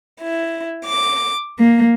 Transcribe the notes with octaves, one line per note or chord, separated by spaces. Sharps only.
E4
D6
A#3